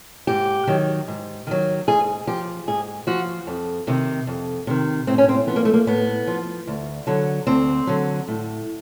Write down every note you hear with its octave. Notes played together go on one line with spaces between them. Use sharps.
G#2 G4
D#3 F#3
G#2
D#3 F#3
G#2 G#4
F3 G4
G#2 G#4
F3 F#4
F2
C3 D#3
F2
C3 D#3
A2 C4
C#4
C4
F3 B3
A#3
A3
A#3
A2 B3
F3
D2
D3 F#3
D2 C4
D3 F#3
A2